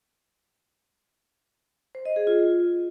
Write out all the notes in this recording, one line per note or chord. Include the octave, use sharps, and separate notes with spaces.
C5
D#5
G#4
F4